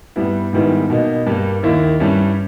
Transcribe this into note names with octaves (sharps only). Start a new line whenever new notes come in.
G2 G3 B3 E4
G#2 D#3 G3 B3 E4
B2 A#3 D#4
G2 G3 A#3
D#2 D#3 A#3 E4
G2 G3 C#4 E4